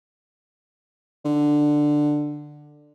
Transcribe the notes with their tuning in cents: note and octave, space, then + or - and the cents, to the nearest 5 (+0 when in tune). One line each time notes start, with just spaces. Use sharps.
D3 +10